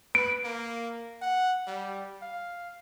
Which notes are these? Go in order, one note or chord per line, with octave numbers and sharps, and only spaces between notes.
B4 D7
A#3
F#5
G3
F5